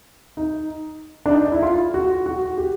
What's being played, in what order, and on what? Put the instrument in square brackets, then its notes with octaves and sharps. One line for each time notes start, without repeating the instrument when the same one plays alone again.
[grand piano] D#4
D4
D#4
E4
F4
F#4
F#4
G4